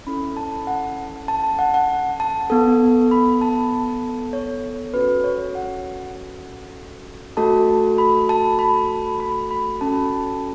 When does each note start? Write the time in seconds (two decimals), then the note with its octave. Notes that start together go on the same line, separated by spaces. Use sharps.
0.07 C#4 E4 A4 B5
0.37 A5
0.67 F#5
1.28 A5
1.44 A5
1.59 F#5
1.74 F#5
2.20 A5
2.50 B3 A4
3.11 B5
3.41 A5
4.33 C#5
4.94 C#4 F#4 A4 B4
5.24 C#5
5.55 F#5
7.37 A3 F#4 A4 A5
7.98 B5
8.29 A5
8.59 B5
9.20 B5
9.51 B5
9.81 C#4 F#4 A4 A5